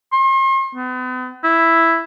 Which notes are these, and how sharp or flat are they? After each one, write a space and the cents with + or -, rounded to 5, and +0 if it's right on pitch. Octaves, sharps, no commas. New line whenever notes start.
C6 +45
B3 +40
E4 +0